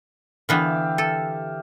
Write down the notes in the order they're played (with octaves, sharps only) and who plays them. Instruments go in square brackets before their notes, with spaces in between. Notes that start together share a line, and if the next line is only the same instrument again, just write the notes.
[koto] D3 E3 B3 [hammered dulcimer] G4 E5 F5
[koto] A4